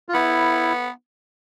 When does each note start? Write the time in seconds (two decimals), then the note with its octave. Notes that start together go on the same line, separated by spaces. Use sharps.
0.09 F4
0.14 B3 E4